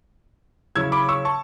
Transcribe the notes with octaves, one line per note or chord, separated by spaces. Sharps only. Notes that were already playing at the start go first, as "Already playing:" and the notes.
C#3 F#3 C#4 E4 E6 G#6
B5 D6
C#6 E6
A5 C#6